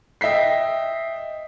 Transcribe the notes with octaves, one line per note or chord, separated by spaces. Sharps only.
D#5 E5 G5 B6 C7